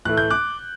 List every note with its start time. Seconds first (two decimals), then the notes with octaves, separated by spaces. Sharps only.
0.05 A2 E3 A3 E4 F#6
0.17 G6
0.31 D6 F#6